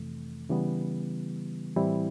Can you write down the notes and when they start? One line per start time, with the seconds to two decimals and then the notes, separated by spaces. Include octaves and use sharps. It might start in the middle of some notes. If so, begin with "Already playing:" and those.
Already playing: F2 C3 E3 A3
0.49 C#3 E3 G3 B3
1.76 A2 E3 G3 C4 E4